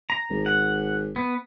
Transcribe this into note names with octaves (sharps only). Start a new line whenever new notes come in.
A#5
G#1
F#5
B3